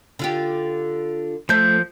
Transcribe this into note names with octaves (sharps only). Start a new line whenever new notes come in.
D3 F4 G4
F3 A3 C5 G6